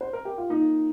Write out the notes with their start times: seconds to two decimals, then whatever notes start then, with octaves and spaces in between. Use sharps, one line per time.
0.01 C5
0.13 A#4
0.25 G4
0.38 F4
0.50 A#3 D#4